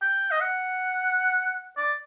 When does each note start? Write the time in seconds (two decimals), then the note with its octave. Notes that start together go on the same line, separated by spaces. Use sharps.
0.01 G5
0.31 D#5
0.40 F#5
1.77 D5